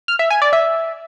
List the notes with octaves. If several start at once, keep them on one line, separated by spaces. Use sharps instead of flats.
F6
E5
G#5
D5
E5